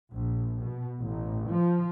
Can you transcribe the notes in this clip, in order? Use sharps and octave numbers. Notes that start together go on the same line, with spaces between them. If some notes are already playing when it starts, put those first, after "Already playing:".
A#1
B2
A1
F3